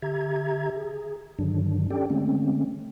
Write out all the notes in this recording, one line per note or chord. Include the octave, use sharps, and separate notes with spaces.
D3 G4 E5 A#5 G#6
G#4
G2 D3 D#3 F#3 D4
C#4 D4 G4 A4 D5 G5
D3 G#3 A3 C4 C#4